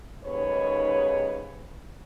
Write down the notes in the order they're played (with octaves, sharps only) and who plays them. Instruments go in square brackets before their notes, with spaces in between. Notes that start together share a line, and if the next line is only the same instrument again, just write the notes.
[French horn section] D#2 G#2 C#3 B4 C#5